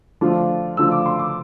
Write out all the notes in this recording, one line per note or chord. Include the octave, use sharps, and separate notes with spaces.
D3 F3 A3 D4 F4
D3 F3 A3 D4 F4 E6
D6
C6
D6